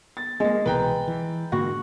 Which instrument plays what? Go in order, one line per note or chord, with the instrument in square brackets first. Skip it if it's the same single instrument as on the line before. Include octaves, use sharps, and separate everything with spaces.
[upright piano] A6
[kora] G#3 [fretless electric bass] A#3 C4
[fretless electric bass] C2 B2 E3 [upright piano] B4 G5 A#5
[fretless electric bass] E3
[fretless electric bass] G#2 D3 A#3 [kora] F#4